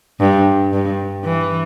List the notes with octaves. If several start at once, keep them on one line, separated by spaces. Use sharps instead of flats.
G2
G2
E3